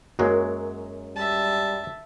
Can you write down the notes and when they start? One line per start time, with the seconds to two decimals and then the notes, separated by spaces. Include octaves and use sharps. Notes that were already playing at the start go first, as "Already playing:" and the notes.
0.19 F#2 F#3 G#3 A#3 F#4
1.16 G3 E5 A5